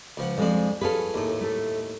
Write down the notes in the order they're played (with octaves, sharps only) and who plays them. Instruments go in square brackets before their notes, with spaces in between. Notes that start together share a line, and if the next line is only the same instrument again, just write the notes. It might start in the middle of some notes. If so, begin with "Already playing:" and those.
[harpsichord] C#2 F3 F#5
[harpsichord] F2 D4 [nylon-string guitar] F3 G#3 C4
[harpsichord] C#4 F4 B4 [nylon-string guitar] G#4 A4
[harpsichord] D#2 A2
[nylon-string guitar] A3 A4